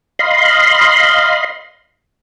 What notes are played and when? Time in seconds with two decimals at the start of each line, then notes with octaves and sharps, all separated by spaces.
0.19 D#5 F5 B5 C6